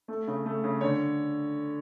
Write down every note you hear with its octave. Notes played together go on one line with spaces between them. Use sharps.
A3
C#3
A3
C#3
D3 C#5